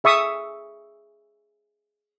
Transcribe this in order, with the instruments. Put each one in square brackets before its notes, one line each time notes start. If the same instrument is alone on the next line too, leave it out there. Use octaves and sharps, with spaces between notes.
[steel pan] G#4 E5 C#6 D#6